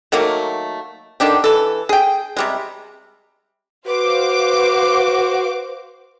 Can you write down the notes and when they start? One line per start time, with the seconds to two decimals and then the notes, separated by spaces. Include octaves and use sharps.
0.12 D#3 F#3 A3 A#3
1.20 D3 D#3 D4 G4
1.44 E3 A4
1.89 G#4 G5
2.37 C3 G3 G#3
3.86 F#4 B4 C5 F5 D6